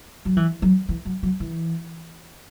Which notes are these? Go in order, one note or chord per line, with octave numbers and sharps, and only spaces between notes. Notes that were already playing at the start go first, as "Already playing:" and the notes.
F#3
E3
F#3
E3
F#3
F#3
E3